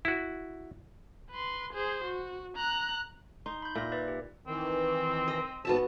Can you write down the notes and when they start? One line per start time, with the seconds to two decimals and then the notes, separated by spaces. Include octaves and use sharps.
0.05 E4 F#4
1.30 B4 C6
1.73 G#4 C5
2.04 F#4
2.56 A#5 F#6
3.46 D#4 C6
3.62 B5 G6
3.75 A#2 E5 A#6
3.92 B4 D5 E5
4.08 G4
4.47 D#3 E3 C4
5.28 D#5
5.65 G#2 C3 B3 F#4 E5 A5